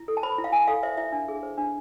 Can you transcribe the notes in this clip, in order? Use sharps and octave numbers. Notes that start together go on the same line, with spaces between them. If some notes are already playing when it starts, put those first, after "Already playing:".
Already playing: E4
A4
A5
C5 B5
E4
F5
E4 G#5
A4 F5
C5 E5
E4 E5
D4
G#4
C5
D4